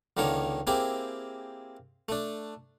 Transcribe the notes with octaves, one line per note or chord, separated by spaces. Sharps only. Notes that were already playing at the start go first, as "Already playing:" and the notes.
C#2 D3 D#3 A#3 C#5
A#3 C4 E4 G4 G#4
A3 D4